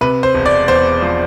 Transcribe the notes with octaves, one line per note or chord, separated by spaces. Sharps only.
C3 B4
C5
E1
D5
E2 C5
F3